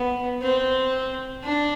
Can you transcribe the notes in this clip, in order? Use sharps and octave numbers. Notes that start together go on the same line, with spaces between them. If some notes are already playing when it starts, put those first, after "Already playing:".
Already playing: B3
C4
D4